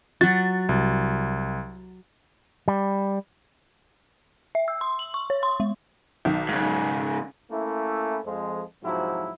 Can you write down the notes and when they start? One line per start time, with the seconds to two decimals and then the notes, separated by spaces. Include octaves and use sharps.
0.21 F#3 F#4 A6
0.69 C2
2.68 G3
4.55 E5
4.68 E6
4.81 C6
4.99 F#7
5.14 C#6
5.30 C#5
5.43 C6
5.60 G#3
6.25 B1 D#3
6.49 G#2 C#3
7.51 A3 A#3 C#4 E4
8.25 F2 F3 G#3
8.84 G#2 C3 F3 F#3 E4 F#4